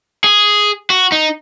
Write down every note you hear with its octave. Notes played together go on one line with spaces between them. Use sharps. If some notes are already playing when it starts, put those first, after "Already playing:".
G#4
F#4
D#4